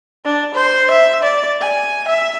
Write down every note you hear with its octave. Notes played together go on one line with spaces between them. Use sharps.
D4
C5
E5
D5
G#5
E5